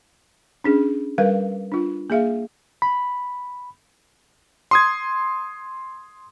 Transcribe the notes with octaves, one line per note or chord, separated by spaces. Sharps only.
C#4 D4 G#4
G3 A#4 B4 F5
D4 F4
A#3 G#4 E5 F5
B5
C6 D#6 G#6